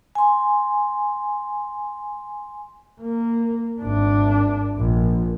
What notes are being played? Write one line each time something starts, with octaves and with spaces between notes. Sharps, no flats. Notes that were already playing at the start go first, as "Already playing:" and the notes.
G#5 C6
A#3
G#1 D4
A#1